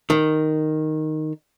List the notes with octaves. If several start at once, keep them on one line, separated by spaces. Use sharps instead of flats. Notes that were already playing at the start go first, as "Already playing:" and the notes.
D#3